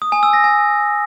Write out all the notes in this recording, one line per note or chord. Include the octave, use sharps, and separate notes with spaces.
D#6
G#5
E6
A#6
G#5